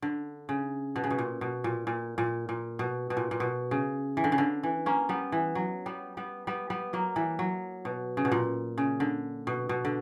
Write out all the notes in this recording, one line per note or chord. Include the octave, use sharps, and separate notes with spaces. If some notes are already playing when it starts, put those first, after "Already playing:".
D3
C#3
B2
C#3
B2
A#2
B2
A#2
A#2
A#2
A#2
B2
B2
A#2
A#2
B2
C#3
E3
D3
C#3
D3
E3
A#3 C#4
G3 B3
E3
F#3
G3 B3
G3 B3
G3 B3
G3 B3
F#3 A#3
E3 G3
F#3
B2
C#3
B2
A#2
C#3
D3
B2
B2
D3